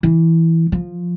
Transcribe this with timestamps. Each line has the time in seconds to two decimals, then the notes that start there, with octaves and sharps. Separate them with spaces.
0.03 E3
0.72 F3